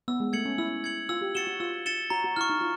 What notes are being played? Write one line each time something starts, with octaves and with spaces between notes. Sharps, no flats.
B3 E6
G#3
A3 G#6 C#7 F#7
C#4
E4 E6
G#6 C#7 F#7
F4 E6
G4
F#4 A6 C#7 E7 G7
F#4
F4 E6
A6 C#7 E7 G7
F#4 A#5
F#4
E4 C#6 F6
D#4
F4